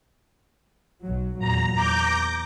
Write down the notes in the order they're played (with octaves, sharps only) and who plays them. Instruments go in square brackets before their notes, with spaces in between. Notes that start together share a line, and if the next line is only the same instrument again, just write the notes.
[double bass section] B1 F#3
[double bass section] E2 A#2 F#3 [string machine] A#5
[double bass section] E2 [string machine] A#5 D6 G6